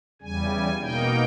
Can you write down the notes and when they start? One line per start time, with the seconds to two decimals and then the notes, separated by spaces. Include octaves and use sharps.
0.22 E2 C#3 G3 G#5
0.81 B2 A#3 D#4 G5